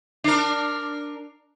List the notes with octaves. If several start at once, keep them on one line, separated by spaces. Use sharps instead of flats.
D4 A#4